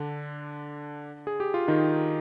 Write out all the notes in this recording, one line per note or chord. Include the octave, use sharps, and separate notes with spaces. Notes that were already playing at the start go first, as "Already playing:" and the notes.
Already playing: D3 D4
G#4
G4
F4
D#3 D#4